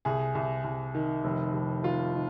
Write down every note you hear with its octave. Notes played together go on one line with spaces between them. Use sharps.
C2 G#4
C2
C2
D#3
F1
F1
D#3 F4
D#3